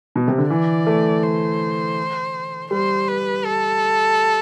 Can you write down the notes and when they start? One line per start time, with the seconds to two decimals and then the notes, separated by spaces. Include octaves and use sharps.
0.16 B2
0.28 C3
0.38 D3
0.50 E3 D5
0.87 A3
1.23 C5
2.71 G3 C5
3.08 B4
3.45 A4